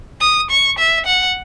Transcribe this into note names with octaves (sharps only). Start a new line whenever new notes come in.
D#6
C#6
E5
F#5